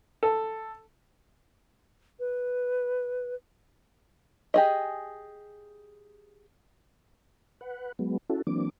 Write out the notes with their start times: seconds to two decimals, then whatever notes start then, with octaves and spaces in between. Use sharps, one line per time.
0.23 A4
2.20 B4
4.54 G4 G#4 D#5
7.61 B4 F#5
7.99 F#3 G#3 B3
8.30 C#4 E4 F#4 A4
8.47 E3 F#3 A#3 C4 D4 D6